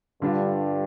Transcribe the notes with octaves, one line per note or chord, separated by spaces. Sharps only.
G2 D3 G3 D4 F4